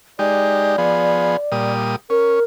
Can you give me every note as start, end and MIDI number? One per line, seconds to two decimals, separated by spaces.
0.19 0.76 56
0.19 0.76 63
0.19 0.76 67
0.19 1.73 74
0.78 1.37 53
0.78 1.37 59
0.78 1.37 68
1.52 1.96 46
1.52 1.96 55
1.52 1.96 87
2.10 2.40 61
2.10 2.43 70